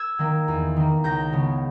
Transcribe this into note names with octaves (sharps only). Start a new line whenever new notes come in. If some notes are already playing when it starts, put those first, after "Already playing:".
Already playing: E6 G#6
D#3 A#3
E2
D#3 A#3
C#2 G6 A#6
C#3 G#3 B3